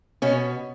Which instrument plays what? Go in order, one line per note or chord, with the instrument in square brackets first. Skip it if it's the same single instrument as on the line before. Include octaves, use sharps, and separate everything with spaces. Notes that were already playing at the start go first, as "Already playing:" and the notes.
[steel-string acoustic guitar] B2 C#4